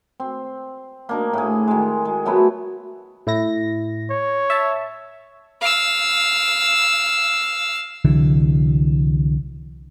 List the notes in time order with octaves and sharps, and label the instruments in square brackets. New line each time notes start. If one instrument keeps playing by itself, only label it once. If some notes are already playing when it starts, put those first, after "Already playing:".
[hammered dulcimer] C4
A#3 D4 D#4
A2 G#4
D#3 G#3
G#3
F#3 A3 B3 E4
[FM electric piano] A2 E4 A#6
[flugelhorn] C#5
[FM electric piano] E5 A5
[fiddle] F5 E6
[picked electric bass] C2 D3 E3 F#3